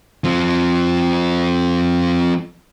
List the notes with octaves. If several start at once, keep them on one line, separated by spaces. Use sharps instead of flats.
F3 C4